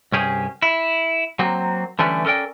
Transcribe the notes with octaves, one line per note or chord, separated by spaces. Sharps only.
C2 G2 C#4 G4 G#4
E4
F#3 A#3 C4
D3 E3 G3 A3 C#4 B4
C#4 A4 A#4 D5 G5